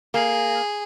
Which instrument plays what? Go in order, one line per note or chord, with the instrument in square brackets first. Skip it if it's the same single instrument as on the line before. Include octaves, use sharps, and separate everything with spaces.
[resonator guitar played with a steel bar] A#3 [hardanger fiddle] G#4